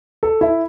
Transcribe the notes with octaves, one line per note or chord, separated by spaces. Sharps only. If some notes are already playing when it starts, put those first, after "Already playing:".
A4
E4